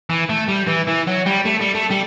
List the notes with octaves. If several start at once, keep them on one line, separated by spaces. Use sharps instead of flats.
E3
A3
G3
E3
E3
F#3
G3
A3
G3
A3
G3